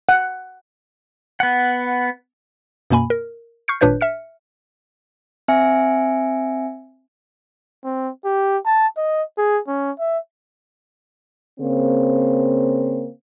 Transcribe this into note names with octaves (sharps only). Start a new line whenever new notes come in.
F#5
B3 F#5
F#2 B2 A#3 G#5 B5
A#4
C#6 F6 G6 C7 C#7
G#1 A#2 D4 B4 C#5 G6
E5 F6 C#7
C4 E5 G#5 C#7
C4
G4
A5
D#5
G#4
C#4
E5
C#3 A#3 C4